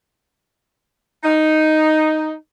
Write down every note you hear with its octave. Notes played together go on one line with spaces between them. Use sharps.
D#4